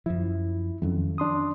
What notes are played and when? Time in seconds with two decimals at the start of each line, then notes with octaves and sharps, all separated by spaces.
0.06 F#2 F3 E4
0.82 F2 D#3 F#3 C#4
1.18 D4 C6 D#6